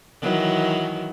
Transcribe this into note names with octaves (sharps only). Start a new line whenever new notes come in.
D#3 E3 F#3